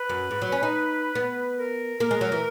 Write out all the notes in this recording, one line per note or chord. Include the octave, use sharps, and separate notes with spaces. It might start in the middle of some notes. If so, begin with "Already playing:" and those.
Already playing: B4
F#2
G#2
F#3
C#4
D#4
B3
A#4
A#3 A#4
G#3
F#3
E3